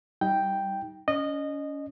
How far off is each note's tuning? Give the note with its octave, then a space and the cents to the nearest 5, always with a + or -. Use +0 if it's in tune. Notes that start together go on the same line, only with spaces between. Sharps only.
G3 -10 D#4 +20 G5 +0
C#4 +30 D#5 -20